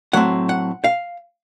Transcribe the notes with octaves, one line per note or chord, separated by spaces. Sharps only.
A2 F#3 A3 C4 F#5
F#5
F5